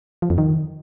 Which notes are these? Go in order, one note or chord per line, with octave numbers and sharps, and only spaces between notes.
F3
F2
D#3